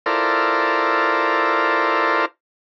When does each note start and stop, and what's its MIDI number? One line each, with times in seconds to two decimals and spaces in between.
0.06 2.25 64
0.06 2.25 65
0.06 2.25 69
0.06 2.25 70
0.06 2.25 72
0.06 2.25 74